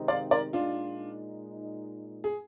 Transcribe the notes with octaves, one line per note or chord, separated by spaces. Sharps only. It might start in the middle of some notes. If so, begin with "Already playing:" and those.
Already playing: C3 D#3 G#3 C4 D#4
D5 F5
A#4 D5
A#2 G#3 D4 D#4 F4
G#4